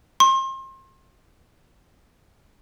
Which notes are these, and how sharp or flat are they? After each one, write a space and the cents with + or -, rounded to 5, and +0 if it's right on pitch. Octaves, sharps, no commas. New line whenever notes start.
C6 +35